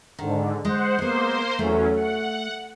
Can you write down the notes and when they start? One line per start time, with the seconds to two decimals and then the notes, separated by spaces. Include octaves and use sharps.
0.19 G#2 D3 D#3
0.65 G#3 C5 F#5
0.99 G#3 A#3 B3 C5 C6
1.59 E2 F#3 A3 C#4
1.96 F#5